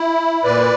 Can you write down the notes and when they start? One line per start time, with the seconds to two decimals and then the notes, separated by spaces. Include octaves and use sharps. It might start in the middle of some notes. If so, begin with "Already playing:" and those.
Already playing: E4
0.44 A#2 B4 D5